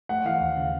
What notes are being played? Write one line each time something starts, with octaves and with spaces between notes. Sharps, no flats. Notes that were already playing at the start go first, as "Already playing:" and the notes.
A3 F#5
E3 F5
D#2
C#3